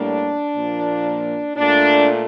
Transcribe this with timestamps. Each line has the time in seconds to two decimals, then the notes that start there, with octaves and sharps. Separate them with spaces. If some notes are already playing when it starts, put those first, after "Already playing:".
Already playing: A2 G3 A#3 D4
0.55 A#2 F3 A#3
1.57 A#2 A3 D4